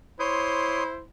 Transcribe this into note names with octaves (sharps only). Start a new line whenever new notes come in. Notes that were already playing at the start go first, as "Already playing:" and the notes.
E4 C5 C#5 C6 D#6